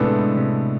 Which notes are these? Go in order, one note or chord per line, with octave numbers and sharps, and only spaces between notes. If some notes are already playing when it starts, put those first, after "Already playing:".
Already playing: A2 C3 G#3 B3 D4 A4
C3